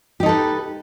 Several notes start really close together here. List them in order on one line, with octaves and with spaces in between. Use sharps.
G4 D#4 A4 B4